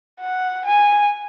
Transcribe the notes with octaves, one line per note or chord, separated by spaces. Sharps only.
F#5
G#5